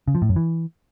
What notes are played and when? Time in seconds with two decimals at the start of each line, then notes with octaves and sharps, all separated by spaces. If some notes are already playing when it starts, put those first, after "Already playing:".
0.08 C#3
0.15 F3
0.22 A2
0.29 F#2
0.36 E3